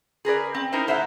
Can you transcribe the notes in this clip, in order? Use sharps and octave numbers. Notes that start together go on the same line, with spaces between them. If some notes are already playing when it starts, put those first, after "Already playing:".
G#4 A#4 B4 D5
C4
D#4 E4 A#4 C5
A2 C5 E5 F#5 A#5